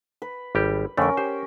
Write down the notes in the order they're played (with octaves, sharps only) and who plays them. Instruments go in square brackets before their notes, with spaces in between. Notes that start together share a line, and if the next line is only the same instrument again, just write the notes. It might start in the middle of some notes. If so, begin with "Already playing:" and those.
[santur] B4
[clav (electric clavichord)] G#1 G3 G4
[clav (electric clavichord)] F2 D3 A3 [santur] C#4 A#4
[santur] G4 [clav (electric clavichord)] C5